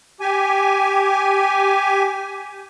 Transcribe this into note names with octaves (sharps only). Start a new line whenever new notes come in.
G4 G#5